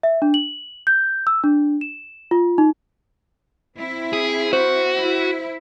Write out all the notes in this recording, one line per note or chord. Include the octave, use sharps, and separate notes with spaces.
E5
D4
F#7
G6
E6
D4
E7
F4
D#4
C4 E4
G#4
F#4 C5
E4